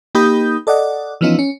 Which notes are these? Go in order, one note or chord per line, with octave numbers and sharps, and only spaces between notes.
A#3 D#4 G4 B5 D#6 G6
A4 D5 D#5 F#5
E3 F3 B3 C#4 D#4 F4
C#4